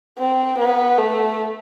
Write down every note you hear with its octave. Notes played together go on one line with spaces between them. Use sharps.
C4
B3
A3